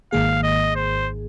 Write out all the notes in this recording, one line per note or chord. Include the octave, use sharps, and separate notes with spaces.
G#1 G#2 D#3 A#3 G#4 F5
D#5
C5